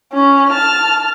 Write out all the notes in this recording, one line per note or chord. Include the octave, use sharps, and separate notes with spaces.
C#4
A5 F6